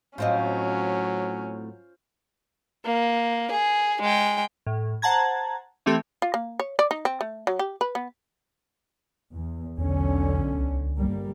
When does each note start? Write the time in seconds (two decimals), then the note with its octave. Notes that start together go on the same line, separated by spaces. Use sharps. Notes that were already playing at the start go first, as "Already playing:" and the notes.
0.18 A2 F#3 C4 C#4 F4 C5 D#5 F5
2.85 A#3
3.51 G#4
4.01 G#3 G5
4.67 A2
5.02 C5 F#5 A5 A#5 G#6
5.86 E3 A3 C4 G4 A4
6.22 F4
6.34 A#3
6.59 C#5
6.79 D5
6.91 D#4
7.05 C4
7.21 A3
7.47 F#3
7.59 G4
7.81 B4
7.95 B3
9.34 E2
9.78 B1 E2 D3 C#4
10.54 C#2
10.97 G1 G3 A#3